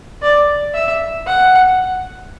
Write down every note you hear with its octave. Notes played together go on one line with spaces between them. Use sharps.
D5
E5
F#5